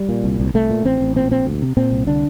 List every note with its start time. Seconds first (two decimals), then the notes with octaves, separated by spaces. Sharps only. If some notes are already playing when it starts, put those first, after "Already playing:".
Already playing: G3
0.09 A#2
0.24 C2
0.40 C2
0.54 C2 A3
0.70 A#2
0.85 A1 C4
1.00 A1
1.16 A#2 C4
1.31 A#1 C4
1.46 D2
1.62 C3
1.77 A#2 C4
1.92 C2
2.07 D3 D4